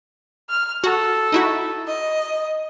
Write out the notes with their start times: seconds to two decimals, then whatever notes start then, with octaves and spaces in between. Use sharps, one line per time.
0.50 F6
0.84 F#4 A4
1.32 D#4 E4 F#4
1.88 D#5